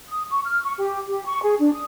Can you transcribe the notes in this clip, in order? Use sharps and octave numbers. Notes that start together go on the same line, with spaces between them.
D#6
C#6
F6
C#6
G4
G4
C#6
G#4
D4
D#6